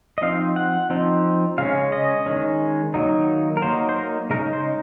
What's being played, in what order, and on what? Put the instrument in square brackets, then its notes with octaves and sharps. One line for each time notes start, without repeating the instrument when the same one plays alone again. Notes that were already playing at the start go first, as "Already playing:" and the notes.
[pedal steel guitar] D#5
F3 C4 D#4 F5
F#5
F3 C4 D#4
C#3 G#3 C#4 F5
D#5
D#3 G#3 C#4
D#3 F#3 A#3 D#4
A#4
F#3 A#3 D#4 C5
C5
A#4
C#3 G#3 D#4 A#4
C5